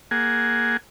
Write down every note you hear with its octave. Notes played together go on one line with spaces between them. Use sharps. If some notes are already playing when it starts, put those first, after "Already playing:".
A#3 G#4 F#5 G#5